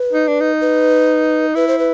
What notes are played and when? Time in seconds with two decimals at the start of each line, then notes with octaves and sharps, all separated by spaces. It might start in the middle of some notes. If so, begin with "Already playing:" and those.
Already playing: B4
0.13 D#4
0.28 D4
0.41 D#4
0.61 B4
1.55 E4 B4
1.68 C5
1.79 B4